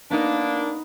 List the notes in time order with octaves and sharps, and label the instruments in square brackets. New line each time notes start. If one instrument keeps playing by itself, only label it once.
[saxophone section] A#3 D4 [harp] B3 D#4